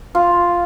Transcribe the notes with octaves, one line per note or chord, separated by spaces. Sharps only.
F4